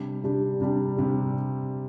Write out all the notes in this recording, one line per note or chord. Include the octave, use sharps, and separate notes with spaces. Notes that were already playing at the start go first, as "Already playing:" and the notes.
Already playing: C3 G3 D4 G4
C3 G3 D4 G4
C3 G3 D4 G4
C3 G3 D4 G4